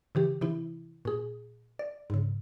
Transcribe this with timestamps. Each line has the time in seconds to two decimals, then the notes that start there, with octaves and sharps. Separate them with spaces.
0.15 C#3 E3 G4
0.41 C3 E3 E4
1.05 A#2 G#4
1.79 D5
2.10 G#2 C#3